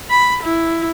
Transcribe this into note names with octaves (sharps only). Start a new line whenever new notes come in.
B5
E4